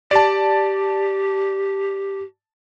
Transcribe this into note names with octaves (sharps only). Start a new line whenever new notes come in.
G4 D5 A5